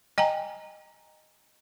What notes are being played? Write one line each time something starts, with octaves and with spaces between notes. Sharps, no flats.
D#5 G5 G#5 A#5